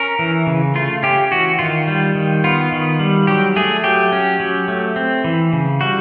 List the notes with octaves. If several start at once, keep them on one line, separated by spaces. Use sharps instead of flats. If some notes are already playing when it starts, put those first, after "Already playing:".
Already playing: C#4 A#4
E3
C#3
A3 F4
C#4 G4
E3 F#4
D#3 F4
G3
D#3
B3 F4
D#3
G3
F#3 G4
A3 G#4
F#3 G4
C#4
F#3
A3
C4
E3
C#3
G3 F#4